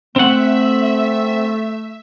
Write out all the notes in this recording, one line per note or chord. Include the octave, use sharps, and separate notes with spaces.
A3 C4 E5 F#5